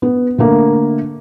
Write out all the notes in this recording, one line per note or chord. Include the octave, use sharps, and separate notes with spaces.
B3
D3 A3 A#3